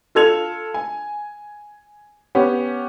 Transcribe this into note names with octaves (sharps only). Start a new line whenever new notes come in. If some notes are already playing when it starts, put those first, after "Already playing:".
F4 A4 G#6 F7
G#5
B3 C#4 G4